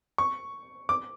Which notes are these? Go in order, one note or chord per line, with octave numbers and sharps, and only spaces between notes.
C#6
D6